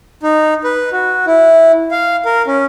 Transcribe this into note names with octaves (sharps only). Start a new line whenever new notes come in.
D#4
B4
F#4
E4
F5
A#4
C#4